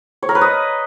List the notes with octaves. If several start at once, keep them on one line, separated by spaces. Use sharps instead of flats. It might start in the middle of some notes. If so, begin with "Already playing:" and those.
C#5
A#4
B4
D#5